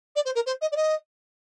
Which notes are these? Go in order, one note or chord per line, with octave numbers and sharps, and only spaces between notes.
D5
C5
A#4
C5
D#5
D5
D#5